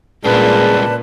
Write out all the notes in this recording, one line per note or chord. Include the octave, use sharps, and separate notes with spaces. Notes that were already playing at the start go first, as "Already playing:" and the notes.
C#2 G2 A#2 G#4 B4 D5 A5